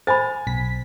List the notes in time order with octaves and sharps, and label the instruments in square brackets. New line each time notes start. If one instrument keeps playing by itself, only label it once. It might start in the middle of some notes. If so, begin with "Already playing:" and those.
[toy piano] C5 B5 [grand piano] G#5 A6
[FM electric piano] B1 B6